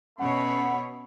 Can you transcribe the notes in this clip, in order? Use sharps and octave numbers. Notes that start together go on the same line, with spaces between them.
B2 A3 C#4 C#5 F#5 B5